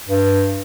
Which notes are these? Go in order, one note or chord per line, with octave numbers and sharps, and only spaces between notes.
G2